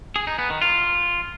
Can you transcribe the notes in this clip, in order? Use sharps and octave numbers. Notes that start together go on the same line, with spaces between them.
G#4
D#4
B3
D#3
F4